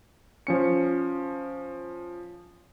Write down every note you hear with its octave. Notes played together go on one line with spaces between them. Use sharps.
F3 C#4 C#7